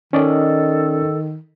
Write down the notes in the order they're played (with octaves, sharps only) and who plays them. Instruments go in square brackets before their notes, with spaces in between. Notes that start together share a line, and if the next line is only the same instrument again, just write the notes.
[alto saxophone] D#3 [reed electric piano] C#4 D5 D#5 [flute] A4